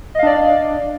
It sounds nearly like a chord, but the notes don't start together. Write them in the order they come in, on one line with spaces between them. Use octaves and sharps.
D#5 F5 D4 D5